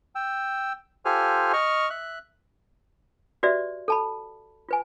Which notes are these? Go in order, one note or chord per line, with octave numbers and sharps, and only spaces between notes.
G5 E6
F4 G4 A4 C5 G#5 F6
D#5 C#6 F6
E5 F#6
F#4 G4 B4 D5 E5
A4 A5 B5
F4 B4 G#5